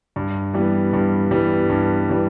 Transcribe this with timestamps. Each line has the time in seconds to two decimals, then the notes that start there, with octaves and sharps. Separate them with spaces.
0.16 G2
0.54 E3 G3 B3
0.93 G2
1.31 E3 G3 B3
1.69 G2
2.09 E3 G3 B3